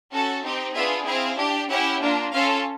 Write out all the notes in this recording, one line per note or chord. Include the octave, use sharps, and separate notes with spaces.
C#4 F#4 A4 A5
C4 D#4 G4
B3 D4 F4 G#4 E5
C4 E4 G#4 F5
D4 G4
C#4 E4 G4 F#5
A#3 D4 F4
C#4 F4 A4 F5